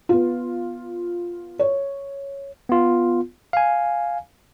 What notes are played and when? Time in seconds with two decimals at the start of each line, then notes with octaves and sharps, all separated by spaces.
0.09 B3 F4
1.59 C#5
2.69 B3 F4
3.53 F5 G#5